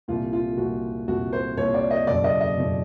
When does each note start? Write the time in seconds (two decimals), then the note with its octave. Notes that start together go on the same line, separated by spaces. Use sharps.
0.08 C2 A#2 F4
0.33 F4
0.58 C2 A#2 F#4
1.08 C2 A#2 F#4
1.33 C5
1.57 C2 A#2 C#5
1.74 D5
1.90 D#5
2.07 F#1 E2 B2 D5
2.24 D#5
2.41 D#5
2.57 F#1 E2 B2